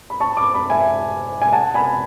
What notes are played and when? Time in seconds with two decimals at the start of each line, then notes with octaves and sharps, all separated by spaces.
0.10 B5
0.20 A5 C#6
0.37 B5 D6
0.53 B5 D6
0.70 E5 G#5
1.42 G#5
1.52 F#5 A5
1.74 G#5 B5